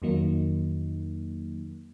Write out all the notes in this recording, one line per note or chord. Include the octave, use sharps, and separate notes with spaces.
F2 D#3 F#3 A#3 D#4